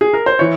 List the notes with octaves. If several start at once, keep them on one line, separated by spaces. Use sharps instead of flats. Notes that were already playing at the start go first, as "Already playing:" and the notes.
G#4
A#4
C5
E3 C#5